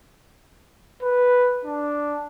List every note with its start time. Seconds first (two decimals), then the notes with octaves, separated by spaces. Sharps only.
1.03 B4
1.65 D4